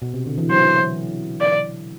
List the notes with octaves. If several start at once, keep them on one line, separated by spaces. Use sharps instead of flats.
B2
C3
D3
E3
F#3 C5
D5